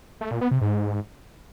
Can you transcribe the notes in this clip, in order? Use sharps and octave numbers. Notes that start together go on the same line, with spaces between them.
A3
A#2
B3
C3
G#2